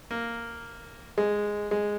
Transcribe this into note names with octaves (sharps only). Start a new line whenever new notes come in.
A#3
G#3
G#3